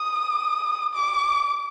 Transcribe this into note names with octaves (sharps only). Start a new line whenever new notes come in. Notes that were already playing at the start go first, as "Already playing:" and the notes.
Already playing: D#6
D6